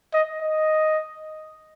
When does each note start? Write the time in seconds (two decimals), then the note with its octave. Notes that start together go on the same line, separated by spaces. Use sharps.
0.14 D#5
0.42 D#5